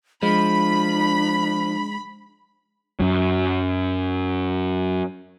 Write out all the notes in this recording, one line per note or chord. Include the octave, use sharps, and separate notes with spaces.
F3 G#3 D4 B5
F#2 F#3